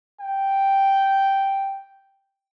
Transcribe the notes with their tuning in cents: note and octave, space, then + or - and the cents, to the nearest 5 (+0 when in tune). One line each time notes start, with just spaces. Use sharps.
G5 -5